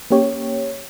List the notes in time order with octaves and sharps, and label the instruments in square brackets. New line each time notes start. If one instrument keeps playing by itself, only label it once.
[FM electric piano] A#3 C#4 G4 C#5